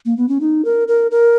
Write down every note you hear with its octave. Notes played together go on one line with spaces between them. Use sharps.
A#3
B3
C#4
D#4
A#4
A#4
A#4